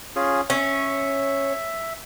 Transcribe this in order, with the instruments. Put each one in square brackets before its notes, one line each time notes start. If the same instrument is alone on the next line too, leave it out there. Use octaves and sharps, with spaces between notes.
[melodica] C#4 F4 G#4
[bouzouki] C#4 [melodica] E5